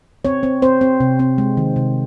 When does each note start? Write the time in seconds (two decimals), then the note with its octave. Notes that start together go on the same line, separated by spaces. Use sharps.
0.25 C4 C#5
0.43 C4
0.62 C4 C5
0.81 C4
1.00 C3
1.19 C4
1.38 G#3
1.57 D#3
1.76 C3